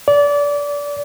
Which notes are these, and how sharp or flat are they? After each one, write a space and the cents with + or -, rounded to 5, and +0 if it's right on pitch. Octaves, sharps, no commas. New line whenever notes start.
D5 -25